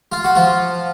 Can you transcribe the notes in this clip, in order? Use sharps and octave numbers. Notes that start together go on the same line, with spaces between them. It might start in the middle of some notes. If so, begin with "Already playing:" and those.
F4
F#4
F3 F4